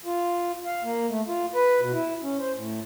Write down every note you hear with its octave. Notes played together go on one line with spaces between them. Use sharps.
F4
F5
A#3
A3
F4
B4
B2
E4
C#4
C5
A2